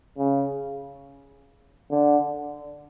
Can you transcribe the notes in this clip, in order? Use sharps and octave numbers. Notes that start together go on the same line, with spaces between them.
C#3
D3